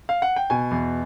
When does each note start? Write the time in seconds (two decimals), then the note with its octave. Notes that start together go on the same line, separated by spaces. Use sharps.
0.09 F5
0.22 F#5
0.36 G5
0.50 B2 G#5
0.71 E2